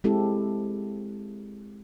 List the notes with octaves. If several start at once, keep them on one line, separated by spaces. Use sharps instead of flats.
G#3 C4 E4 G4 A4